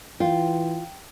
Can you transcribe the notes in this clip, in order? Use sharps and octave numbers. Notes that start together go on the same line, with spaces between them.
E3 F4 G5